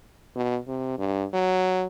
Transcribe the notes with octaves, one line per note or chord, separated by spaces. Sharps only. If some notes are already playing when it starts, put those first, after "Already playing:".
B2
C3
G2
F#3